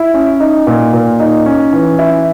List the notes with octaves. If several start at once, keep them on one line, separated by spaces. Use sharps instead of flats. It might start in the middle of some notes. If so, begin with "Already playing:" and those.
Already playing: E4
C#4
D#4
A#2
A#2
D#4
C#4
E3
E4